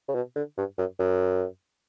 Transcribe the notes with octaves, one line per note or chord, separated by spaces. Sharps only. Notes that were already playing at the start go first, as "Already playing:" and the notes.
C#3
B2
D3
G2
F#2
F#2